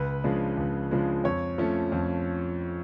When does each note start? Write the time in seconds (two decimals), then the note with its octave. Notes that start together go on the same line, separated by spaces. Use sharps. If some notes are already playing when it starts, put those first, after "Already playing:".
Already playing: C#2 B4
0.24 C#3 F3 G#3 D4
0.57 C#2
0.91 C#3 F3 G#3 D4
1.24 F2 C#5
1.58 F3 A3 C#4
1.92 F2